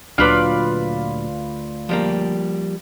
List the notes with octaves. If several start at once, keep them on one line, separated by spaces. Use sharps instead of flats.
D2 A#2 F#3 D4 F4 B4 D5
F3 G3 A#3